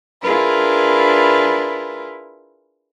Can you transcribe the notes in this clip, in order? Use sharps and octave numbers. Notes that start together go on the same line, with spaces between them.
D4 E4 F4 G#4 A#4 B4